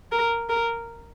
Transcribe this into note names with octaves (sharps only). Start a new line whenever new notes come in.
A#4
A#4